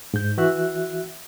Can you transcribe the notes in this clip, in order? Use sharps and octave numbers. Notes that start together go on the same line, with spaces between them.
G#2 G6
E3 F#4 E5 F#6